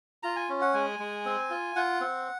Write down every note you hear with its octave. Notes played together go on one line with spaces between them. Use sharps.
F4 A#5
G#5
C#4
F#5
G#3 G#5
G#3
C4
F4
F4 F#5
C4